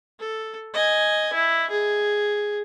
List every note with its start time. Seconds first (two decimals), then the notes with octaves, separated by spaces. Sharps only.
0.20 A4
0.74 D#5 G#5
1.33 E4
1.70 G#4